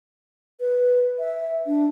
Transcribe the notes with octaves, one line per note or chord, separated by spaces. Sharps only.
B4
E5
D4